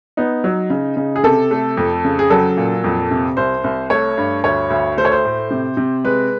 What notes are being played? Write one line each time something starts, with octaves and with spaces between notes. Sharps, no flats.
B3 D#4
F#3
C#3
C#3
G#4
C3 A4
A3
F2
C#3
G#4
F#3 A4
A#2
F2
C3
C2 C5
C2
A3 C#5
G2
D2 C#5
D2
A3 C5
C#5
C5
A2
C3
C3
G#3 B4